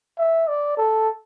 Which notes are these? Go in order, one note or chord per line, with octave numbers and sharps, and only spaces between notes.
E5
D5
A4